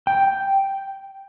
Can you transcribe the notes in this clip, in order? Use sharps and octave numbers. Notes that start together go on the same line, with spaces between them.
G5